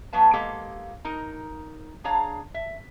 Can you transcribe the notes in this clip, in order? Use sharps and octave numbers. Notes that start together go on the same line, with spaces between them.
F#3 B3 B4 F5 A5
G#3 A#3 G4 A4 F5
D#4 A#4
D4 G#4 C#5 F5 A#5
E5